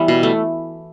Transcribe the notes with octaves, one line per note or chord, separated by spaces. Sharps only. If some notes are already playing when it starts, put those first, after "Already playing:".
Already playing: E3 G3 B3 E4
B2
A3